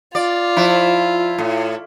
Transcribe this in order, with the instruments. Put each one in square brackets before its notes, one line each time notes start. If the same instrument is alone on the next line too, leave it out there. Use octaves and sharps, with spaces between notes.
[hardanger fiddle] F4 [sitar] D5
[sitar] F3 E4
A2